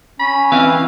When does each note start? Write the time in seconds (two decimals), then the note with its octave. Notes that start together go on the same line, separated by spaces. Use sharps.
0.20 C#4 B5
0.52 E3 C4 F5